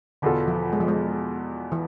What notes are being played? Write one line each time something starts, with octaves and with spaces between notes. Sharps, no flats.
E2 B2 D3 B3 F4 A4
F3
G#3
F3
G#3
E3